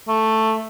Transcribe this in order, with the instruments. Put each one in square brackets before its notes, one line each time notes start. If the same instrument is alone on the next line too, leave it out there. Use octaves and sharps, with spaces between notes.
[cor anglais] A3